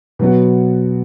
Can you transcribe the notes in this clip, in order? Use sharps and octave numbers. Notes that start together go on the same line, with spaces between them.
B2 F#3 B3 F#4